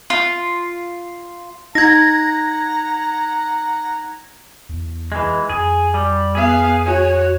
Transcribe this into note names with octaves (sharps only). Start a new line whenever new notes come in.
F4
D#4 F#5 A#5 G#6 A#6
E2
E3 G#3
F2 G#4
G3
B3 G#4 F5
F#4 C#5